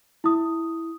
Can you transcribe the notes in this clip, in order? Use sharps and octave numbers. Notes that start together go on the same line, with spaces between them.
E4 D#6